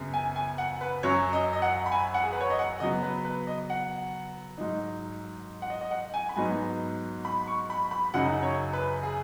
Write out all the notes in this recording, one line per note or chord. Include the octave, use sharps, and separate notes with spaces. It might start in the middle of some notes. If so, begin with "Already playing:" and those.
Already playing: F#2 C#3 B3
G#5
G#5
F#5
B4
F#2 F#3 C#4 C#5
D#5
D#5
F#5
B5
G#5
F#5
G#4
B4
C#5
D#5
F#5
C#3 F#3 B3 D#5
B4
B4
D#5
F#5
G#2 F#3 D#4
F#5
D#5
D#5
F#5
G#5
B5
G#2 F#3 B3 D#4 G#5
B5
C#6
B5
B5
F#2 C#3 F#3 D#4 F#5
C#5
B4
G#4